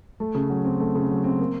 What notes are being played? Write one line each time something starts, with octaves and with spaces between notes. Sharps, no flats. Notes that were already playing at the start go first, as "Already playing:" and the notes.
A3
C#3
F#3
C4
A3
C#3
F#3
C4
A#3